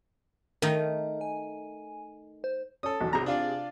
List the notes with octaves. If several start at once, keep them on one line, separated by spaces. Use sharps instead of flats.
D#3 A3 D#4 A#4
G#5
C5
C#4 A4 D#6
B1 E2 F#3
B1 C3 G#4 A#5
D4 F4 D5